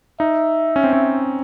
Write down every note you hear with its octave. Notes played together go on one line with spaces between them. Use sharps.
D#4 E5
C#4
C4
C#4